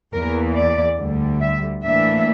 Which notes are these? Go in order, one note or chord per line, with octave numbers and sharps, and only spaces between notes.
E2 E3 A#3 A#4
D5
D2 D3 G3
E5
A2 E3 A#3 D4 E5